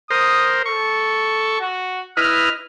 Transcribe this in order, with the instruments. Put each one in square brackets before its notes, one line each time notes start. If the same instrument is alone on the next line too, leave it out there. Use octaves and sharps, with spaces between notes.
[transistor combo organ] A#4 C5 [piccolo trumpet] D#6
[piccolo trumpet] A4 [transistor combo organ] C#6
[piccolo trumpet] F#4
[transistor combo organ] E4 B4 D#5 [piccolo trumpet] F6